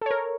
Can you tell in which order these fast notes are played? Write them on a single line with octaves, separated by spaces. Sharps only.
A4 C#5 A#4